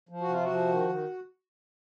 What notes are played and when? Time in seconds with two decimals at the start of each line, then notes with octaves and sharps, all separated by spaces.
0.09 F3
0.21 F#4
0.29 C3 F4
0.44 F3 F#4
0.69 D#3
0.89 D#3